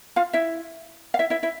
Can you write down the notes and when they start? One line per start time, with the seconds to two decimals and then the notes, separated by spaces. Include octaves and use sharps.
0.16 F4 F5
0.33 E4 E5
1.14 F5
1.19 E4 E5
1.30 E4 E5
1.43 E4 E5